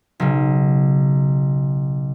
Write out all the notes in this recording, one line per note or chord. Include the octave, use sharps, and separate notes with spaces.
B1 C#3